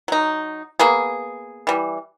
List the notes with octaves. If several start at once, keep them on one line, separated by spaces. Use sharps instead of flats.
F#3 D#4
A#3 B3 G#4
E3 G3